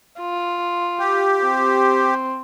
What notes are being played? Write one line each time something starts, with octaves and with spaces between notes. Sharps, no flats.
F4
G4
C4